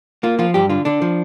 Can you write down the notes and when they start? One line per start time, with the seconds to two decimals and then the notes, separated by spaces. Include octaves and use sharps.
0.23 A#3 F4
0.39 F3 F4
0.54 G2 G4
0.69 D3 F4
0.85 D3 D4
1.02 F3